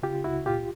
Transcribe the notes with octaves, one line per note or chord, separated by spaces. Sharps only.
C#3 F4 G4
C#2 E4 F#4
A#2 F4 G4